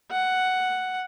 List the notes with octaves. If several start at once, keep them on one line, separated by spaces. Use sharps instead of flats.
F#5